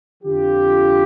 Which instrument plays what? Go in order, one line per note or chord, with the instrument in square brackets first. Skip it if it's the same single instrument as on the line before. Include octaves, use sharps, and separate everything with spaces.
[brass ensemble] F2 D3 F3 F4 G4